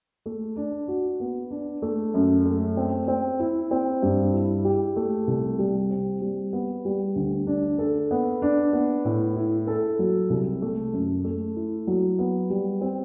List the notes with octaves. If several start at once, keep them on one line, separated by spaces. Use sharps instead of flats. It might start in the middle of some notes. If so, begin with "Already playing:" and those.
A3
D4
F#4
B3
D4
A3
F#2
A3
C4
C4
E4
C4
G2
E4
G4
A3
C2
G3
C4
G3
B3
G3
D2
D4
A4
B3
D4
B3
A2
E4
A4
F#3
C2
A3
F#2
A3
E4
F#3
B3
G3
C4